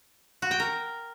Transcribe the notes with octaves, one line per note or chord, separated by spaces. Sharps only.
F#4
G5
A#4